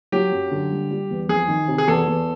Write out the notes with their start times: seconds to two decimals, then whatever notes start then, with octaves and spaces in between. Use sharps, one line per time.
0.12 F#3 G4
0.32 F#2
0.51 D3
0.71 G3
0.91 G3
1.10 E2
1.29 F2 G#4
1.48 D#3
1.68 C3
1.78 G#4
1.87 E2 A4
2.08 E2